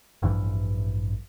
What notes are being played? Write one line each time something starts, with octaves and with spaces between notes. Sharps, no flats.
A1 G2 E3 F3